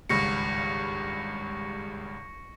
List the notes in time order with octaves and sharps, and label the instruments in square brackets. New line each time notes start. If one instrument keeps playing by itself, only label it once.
[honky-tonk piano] G#1 C#2 G2 [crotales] C#6 A#6 C#7